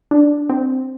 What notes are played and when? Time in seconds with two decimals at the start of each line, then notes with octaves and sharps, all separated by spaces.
0.11 D4
0.50 C4